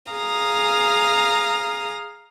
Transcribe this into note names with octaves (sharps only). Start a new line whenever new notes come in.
G#4 F5 A#5 D#6